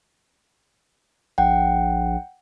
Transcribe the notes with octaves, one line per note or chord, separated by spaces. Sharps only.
A#1 F#5 G5